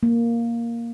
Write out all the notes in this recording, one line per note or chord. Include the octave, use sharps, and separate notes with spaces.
A#3